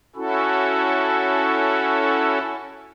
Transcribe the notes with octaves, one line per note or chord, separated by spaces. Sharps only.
C#4 E4 F#4 A4